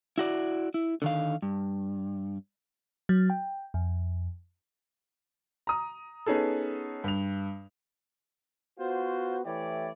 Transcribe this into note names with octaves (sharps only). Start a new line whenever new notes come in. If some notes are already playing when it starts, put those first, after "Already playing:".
E4 F#4 D5
E4
D3 D#3 F5
G2
F#3
G5
F2
A#5 D#6
B3 C#4 D#4 G#4 A4
G2 F7
B3 F4 F#4 C5
E3 A3 E4 G4 C#5 D5